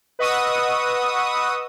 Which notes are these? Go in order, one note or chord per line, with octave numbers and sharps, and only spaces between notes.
B4 D#5 F#5 C#6 D#6 E6